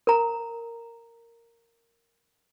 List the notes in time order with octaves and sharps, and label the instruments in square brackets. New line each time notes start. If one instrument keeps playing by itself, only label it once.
[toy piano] A#4 A#5